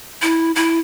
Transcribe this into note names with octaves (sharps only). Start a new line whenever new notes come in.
E4
E4